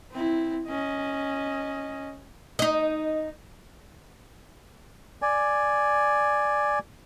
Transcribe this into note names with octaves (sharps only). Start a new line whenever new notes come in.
C4 E4
C#4 D#5
D#4 D#5
D5 G#5